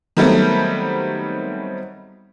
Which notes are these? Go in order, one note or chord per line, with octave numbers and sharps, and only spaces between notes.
D#3 F#3 G3 A3 B3 C4